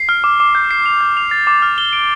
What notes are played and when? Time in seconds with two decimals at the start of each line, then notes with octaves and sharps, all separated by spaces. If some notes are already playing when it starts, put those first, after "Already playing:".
Already playing: C7
0.09 F6
0.24 D6
0.40 D6
0.55 G6
0.71 C7
0.86 F7
1.01 G6
1.17 F7
1.31 A6
1.47 D6
1.62 F6
1.78 G7
1.93 D7